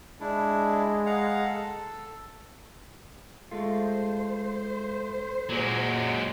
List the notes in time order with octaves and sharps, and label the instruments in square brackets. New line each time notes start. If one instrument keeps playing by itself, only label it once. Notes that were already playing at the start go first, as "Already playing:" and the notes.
[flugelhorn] G#3 [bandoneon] D4 E4
[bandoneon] F5 F#5 A#5
A4
[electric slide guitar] G#3 A3 F4 [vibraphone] A4 [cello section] C5
[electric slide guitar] A#2 [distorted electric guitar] F#3 G#3